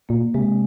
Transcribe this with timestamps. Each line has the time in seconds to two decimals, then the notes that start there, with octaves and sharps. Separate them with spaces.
0.09 A#2 A#3
0.34 C3 G#3